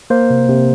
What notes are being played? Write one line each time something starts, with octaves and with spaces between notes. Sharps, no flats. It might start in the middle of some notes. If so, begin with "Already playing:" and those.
A#3 C5
C3
C3